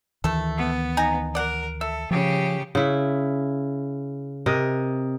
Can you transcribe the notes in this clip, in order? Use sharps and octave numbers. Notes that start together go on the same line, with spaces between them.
D2 D#3 E3 A3 A4
B3
D#4 G#5 A#5
A#4 D5 F#5
A4 E5
C#3 F3 G4
C#3 E4
C3 A#4 D#5